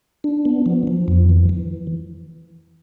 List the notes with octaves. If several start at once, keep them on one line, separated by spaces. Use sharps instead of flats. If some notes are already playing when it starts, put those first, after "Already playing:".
D4
B3
F3
F3
F2
E3
E3